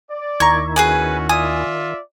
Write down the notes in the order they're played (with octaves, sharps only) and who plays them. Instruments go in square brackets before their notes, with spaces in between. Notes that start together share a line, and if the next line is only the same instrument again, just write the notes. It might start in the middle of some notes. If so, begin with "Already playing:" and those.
[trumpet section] D5
[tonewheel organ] D#2 D#3 E4 [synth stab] A#5 G#6 [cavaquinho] C#6
[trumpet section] C#4 F#4 [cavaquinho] G#4 B4 G#5
[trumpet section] F4 D5 E5 [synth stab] G#5 [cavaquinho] D#6
[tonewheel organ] D#3